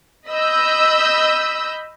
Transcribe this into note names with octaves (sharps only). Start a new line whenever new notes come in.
D#5 B5 E6 G6